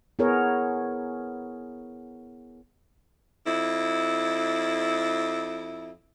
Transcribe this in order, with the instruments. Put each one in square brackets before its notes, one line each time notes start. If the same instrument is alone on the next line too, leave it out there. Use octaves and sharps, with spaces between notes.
[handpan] B3 E4 G#4 A#4 C#5
[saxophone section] F2 E4